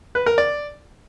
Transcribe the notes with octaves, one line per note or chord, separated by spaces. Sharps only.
B4
A#4
D5